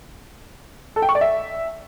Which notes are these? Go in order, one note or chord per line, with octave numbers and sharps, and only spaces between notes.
A4
G5
C#6
D5
E5